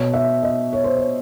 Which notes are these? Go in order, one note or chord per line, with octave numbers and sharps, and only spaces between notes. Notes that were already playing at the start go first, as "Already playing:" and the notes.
Already playing: B2 C#5
E5
D#5
C#5
C5
C#5